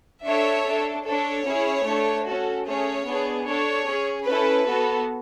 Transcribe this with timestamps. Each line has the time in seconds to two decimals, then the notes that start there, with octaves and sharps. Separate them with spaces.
0.25 D4 A4 C#5 E5
0.65 D4 A4
1.05 D4 A4 C#5
1.46 C#4 E4 G#4
1.86 A3 D4 A4
2.27 C#4 F#4 A4
2.66 A3 C#4 G#4 C#5
3.06 B3 D4 G#4
3.47 D4 A4 C#5
3.87 C#4 G#4
4.27 C#4 E4 A4 B4
4.67 B3 F#4 A4